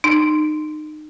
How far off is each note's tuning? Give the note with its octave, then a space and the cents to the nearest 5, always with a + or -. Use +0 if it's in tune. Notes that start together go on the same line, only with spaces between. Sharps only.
D#4 -30